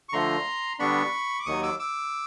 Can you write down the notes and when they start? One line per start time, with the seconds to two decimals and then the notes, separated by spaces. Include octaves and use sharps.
0.09 C#6
0.13 D3 F3 A3 A#5 C6
0.79 D3 G3 B3 D4 B5 C#6
1.39 D6
1.46 D#2 D#3 F#3 C#6 D#6
1.63 D6 E6
1.79 D6 E6